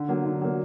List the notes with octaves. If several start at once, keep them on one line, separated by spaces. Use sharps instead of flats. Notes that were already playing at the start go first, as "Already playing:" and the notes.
Already playing: D3
F#3 A#3
D3
F#3 A#3